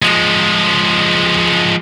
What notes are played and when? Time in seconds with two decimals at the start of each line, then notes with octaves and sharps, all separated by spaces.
0.02 F3 G#3